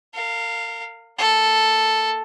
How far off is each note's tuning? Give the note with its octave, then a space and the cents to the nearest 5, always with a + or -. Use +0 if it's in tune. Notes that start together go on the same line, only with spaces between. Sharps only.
A#4 -35 F5 +0
A#3 +5 A4 +0